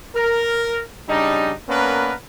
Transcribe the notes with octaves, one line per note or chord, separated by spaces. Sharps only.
A#4
C#3 G3 D4 D#4
A#3 B3 C#4 D4 A#4 B4